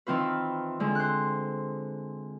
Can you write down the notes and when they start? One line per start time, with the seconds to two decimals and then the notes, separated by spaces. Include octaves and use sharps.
0.07 D#3 E3 C4 F4 B4
0.80 D3 G#3 C4
0.95 C5 F#6